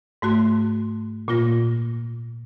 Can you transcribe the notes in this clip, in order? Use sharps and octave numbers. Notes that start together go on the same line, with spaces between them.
G#2 A3 F#4 C6
A#2 A#3 F4 A#6